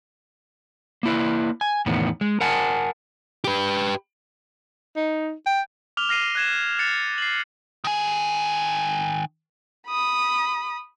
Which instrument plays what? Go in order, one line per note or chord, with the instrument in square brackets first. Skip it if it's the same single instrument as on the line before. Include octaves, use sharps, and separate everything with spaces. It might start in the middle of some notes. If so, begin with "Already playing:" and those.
[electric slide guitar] A#3 E4 B4
G#5
E2 A2 D#3 B3
G#3
A#4 F#5 G#5 A5
[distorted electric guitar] G4 B4
[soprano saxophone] D#4
G5
[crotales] D6 F6 F7 G7
F6 A#6 C7 D#7
F#6 G#6 E7
F#6 A6 C#7 F7
C7 F#7
[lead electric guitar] D#3 G#5
[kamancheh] B5 D#6